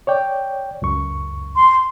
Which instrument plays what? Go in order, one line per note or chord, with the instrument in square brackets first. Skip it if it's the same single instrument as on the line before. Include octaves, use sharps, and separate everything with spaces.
[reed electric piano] C#5 D5 G5
C#2 F#2 C#6
[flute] C6